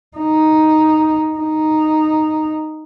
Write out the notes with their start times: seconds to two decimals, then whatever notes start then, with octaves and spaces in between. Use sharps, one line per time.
0.17 D#4
1.37 D#4